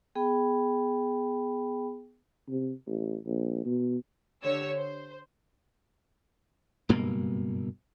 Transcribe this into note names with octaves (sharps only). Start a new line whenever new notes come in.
B3 G#4 G5 B5
C3
A1
A#1
B2
D3 G4 C#5 E6
C5
F#1 G2 B2 A#3